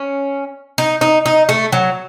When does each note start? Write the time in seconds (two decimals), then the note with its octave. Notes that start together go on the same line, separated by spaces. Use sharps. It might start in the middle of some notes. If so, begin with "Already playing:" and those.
Already playing: C#4
0.78 D#4
1.01 D#4
1.26 D#4
1.49 A3
1.72 F#3